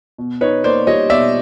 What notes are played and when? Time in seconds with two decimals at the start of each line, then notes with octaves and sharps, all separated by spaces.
0.18 B2
0.41 D#4 B4 C#5
0.64 A#3 C5 D5
0.87 G3 C#5 D#5
1.10 B2 D5 E5